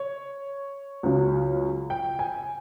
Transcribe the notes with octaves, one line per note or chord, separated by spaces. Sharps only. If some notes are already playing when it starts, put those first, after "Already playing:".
Already playing: C#5
C#2 C#3 F#3
G5
G#5